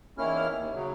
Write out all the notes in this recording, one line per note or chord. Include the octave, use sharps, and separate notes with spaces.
E2 D#3 A#3 C#4 E4 F6
D#2
C#3 F#3